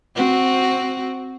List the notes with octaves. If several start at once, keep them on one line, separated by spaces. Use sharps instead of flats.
C4 F#4